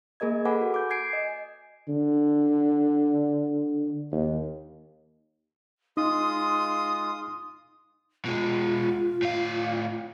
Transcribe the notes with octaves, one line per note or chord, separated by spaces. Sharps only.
A#3 G#4 A#4 D#5 G#6
A4 B4 F#5 G#5 B5 D6
F#4
D6 G6
G#5 G#6 C7 D7
D#5
D3
D#2
G#3 D#4 F4 C6 D#6
B2 G#3 F4
A2 F5